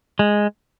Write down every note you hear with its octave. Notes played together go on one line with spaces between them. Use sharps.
G#3